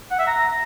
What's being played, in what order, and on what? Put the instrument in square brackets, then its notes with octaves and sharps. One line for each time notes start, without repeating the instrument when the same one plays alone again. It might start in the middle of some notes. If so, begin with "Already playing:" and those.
[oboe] F#5
E5
A#5